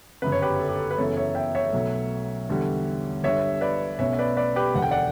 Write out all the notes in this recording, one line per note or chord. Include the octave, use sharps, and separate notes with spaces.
G1 F#2 C#3 B4
C#5
G4 B4
A4
G4
A4
B4
F#2 C#3 E3 B3 A4 C#5
C#5 E5
E5 G5
C#5 E5
B1 B2 F#3 A3
E2 D3 G3
G1 G2 D3 G3 C#5 E5
B4 D5
B1 B2 A3 C#4 C#5 E5
E5
B4 D5
B4 D5
G4 B4
E1 D2 D3 F#5
G5
D5 F#5